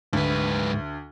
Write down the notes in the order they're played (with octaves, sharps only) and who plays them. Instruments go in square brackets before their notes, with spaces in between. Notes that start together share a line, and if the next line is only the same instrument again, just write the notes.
[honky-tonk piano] D2 [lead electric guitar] G#2 B4